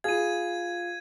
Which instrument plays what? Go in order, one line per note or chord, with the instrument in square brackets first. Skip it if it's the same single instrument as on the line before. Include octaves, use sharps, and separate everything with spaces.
[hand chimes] F4 F5 [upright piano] G#4 [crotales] G#6 D#7